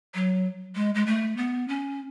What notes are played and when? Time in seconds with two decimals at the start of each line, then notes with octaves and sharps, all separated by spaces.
0.14 F#3
0.75 G#3
0.94 G#3
1.06 A3
1.37 B3
1.68 C#4